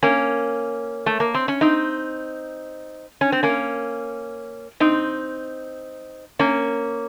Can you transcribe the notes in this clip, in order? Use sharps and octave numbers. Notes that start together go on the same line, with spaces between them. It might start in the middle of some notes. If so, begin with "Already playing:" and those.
A#3 C#4
A3
A#3
C4
C#4
C4 D#4
C#4
C4
A#3 C#4
C4 D#4
A#3 C#4